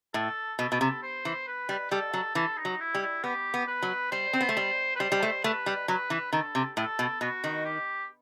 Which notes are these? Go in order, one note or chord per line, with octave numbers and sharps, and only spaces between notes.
A2 A4
B2 A4
B2
C3
C5
E3
B4
G3
G3 A4
F#3
E3 A4
D#4
F#3
E4
G3
E4
B3 G4
B3
B4
F#3
G3 C5
C4
B3
A3
G3
B4
G3 C5
G3
A3
A3 B4
G3
F#3 B4
E3
D#3 A4
C3
A2 A4
B2
B2 F#4
D#3
G4